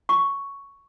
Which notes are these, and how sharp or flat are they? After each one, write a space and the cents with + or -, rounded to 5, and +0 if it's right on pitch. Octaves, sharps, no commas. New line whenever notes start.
C#6 +5